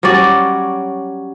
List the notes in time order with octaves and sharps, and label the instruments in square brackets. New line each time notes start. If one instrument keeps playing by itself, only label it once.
[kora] F#3 G3 C#4 D5